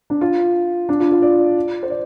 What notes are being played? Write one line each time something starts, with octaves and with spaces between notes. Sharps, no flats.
D4
F4
D4
F4
F4
D5
C5
D5